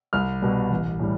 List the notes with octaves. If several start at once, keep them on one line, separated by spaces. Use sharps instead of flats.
C2 F6
B2 G3
A1
A2 G3